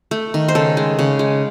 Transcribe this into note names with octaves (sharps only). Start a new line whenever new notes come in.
A3
D#3
C5
C#3 A4
G#3
C#3
G#3